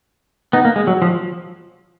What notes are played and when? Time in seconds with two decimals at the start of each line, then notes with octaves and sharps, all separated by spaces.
0.53 B3 D#4
0.65 A#3
0.76 G#3
0.87 F#3
1.02 F3